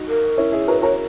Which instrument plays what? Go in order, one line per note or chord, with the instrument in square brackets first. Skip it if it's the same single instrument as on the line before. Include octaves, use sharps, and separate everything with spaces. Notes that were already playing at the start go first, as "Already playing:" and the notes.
Already playing: [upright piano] D#4 F#4
[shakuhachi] A#4
[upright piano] C#4 E4
E4 G#4
[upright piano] F#4 A#4 [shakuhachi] B4
[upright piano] F#4 A#4 [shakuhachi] C#5